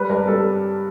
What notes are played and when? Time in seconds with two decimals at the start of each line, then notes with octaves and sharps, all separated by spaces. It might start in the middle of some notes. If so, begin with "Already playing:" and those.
Already playing: G3 B4
0.10 G2 A#4
0.27 G3 A4